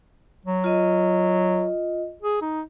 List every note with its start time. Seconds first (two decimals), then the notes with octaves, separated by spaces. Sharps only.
0.46 F#3
0.64 F4 D#5
2.23 G#4
2.42 D#4